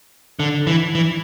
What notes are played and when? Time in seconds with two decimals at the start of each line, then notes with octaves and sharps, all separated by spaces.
0.40 D3
0.67 E3
0.95 E3